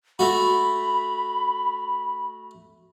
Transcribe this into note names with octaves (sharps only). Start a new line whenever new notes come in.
A3 F#4 B5